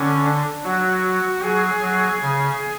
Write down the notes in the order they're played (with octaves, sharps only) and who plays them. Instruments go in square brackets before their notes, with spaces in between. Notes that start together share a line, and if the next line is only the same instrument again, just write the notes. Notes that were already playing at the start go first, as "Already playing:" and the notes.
Already playing: [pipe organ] D3 [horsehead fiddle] C#4
[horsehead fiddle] D4
[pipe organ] F#3 [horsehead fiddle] F#4
[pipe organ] F#3 [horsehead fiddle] G#4
[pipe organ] F#3
C#3